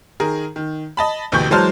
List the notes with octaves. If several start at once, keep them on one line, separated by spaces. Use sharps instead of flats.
D#3 G#4 A#4
D#3
D#5 A5 B5
A1 D2 B2 G4 C#6 G6
E3 F#3 G#3 C5 A5 F6